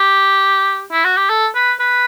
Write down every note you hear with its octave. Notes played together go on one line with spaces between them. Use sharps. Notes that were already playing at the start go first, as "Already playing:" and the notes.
Already playing: G4
E4
F#4
G4
A4
B4
B4